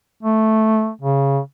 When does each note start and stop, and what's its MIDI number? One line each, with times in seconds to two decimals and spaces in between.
0.23 0.90 57
1.01 1.39 49